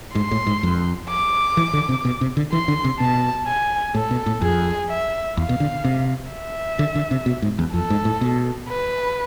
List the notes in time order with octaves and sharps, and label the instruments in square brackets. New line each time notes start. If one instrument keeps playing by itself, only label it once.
[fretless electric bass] G#2 [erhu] C6
[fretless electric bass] A2
G#2
F2
[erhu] D6
[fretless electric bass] E3
D3
C3
B2
C3
D3
[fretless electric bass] E3 [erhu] C6
[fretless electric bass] D3
C3
[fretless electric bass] B2 [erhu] A5
[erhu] G#5
[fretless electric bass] A2 [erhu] A4
[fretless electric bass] B2
A2
[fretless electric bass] F2 [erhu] G#4
[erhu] E5
[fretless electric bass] E2 [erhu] F5
[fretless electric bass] B2
D3
C3
[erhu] E5
[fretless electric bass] D3
D3
C3
B2
G#2
E2
[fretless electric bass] F2 [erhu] A4
[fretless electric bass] G#2
A2
B2
[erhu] B4